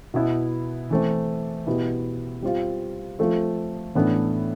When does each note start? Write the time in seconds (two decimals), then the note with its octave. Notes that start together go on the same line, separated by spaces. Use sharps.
0.14 B2 B3 E4 B4
0.90 E3 A3 C4
1.67 B2 B3 E4 G4 B4
2.42 G3 C4 F4
3.19 F3 A3 C4 F4 A4
3.95 A2 E3 B3 D4 A4